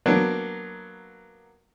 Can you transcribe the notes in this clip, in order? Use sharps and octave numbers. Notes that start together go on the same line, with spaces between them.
F#3 A#3 B3 D4